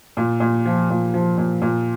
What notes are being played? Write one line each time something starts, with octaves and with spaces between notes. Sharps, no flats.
A#2
A#2
F3
A#2
F3
A#2
A#2